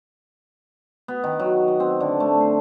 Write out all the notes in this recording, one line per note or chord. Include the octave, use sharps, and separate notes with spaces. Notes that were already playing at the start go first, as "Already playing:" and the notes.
B3
D#3
F#3
D#5
C4
D3
A3
C5